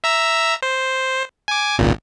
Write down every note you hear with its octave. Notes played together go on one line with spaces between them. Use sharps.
E5 A#5 E6
C5
G#5 D6
G#1 C#2 A#2